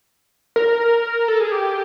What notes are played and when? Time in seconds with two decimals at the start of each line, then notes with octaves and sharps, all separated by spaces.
0.56 A#4
1.28 A4
1.40 G#4
1.52 G4